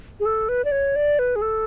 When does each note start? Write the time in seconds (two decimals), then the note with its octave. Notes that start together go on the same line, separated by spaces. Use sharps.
0.20 G#4
0.26 A4
0.49 B4
0.65 D5
0.72 C#5
0.96 D5
1.19 B4
1.36 G#4
1.42 A4